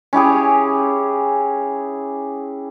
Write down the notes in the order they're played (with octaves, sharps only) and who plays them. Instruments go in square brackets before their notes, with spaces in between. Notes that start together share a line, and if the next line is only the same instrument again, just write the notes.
[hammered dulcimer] C#4 E4 G4 G#4